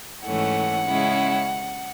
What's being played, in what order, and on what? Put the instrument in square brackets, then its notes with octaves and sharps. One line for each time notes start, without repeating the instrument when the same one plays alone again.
[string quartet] G#2 E3 A3 C#4 F#5
C#3 G#3 C#4 E4